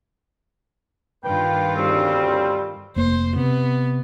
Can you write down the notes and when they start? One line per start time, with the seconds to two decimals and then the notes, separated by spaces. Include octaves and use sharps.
1.24 G2 D#3 F4 B4 G5
1.76 D2 C#3 G3 C4
2.96 F1 A#3 C5
3.36 C3 B3